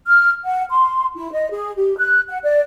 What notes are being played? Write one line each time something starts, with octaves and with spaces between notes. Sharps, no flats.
F6
F#5
C6
E4
D#5
G#4
G4
F#6
F#5
D5